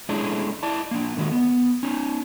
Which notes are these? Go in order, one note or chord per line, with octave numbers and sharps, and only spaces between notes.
G#3 A3 C#4 D4 E4 G#4
E4 D5 A5
A#3 D4
D3 D#3 G#3 F#4
B3
C#4 D#4